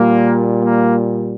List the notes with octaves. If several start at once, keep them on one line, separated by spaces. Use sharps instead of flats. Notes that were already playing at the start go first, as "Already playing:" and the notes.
Already playing: A#2 G3 A#3
A#3